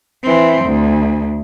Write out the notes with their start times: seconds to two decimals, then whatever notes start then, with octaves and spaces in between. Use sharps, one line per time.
0.22 E3 C4
0.64 D2